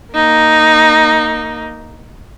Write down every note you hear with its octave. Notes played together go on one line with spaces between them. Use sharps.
A#3 D#4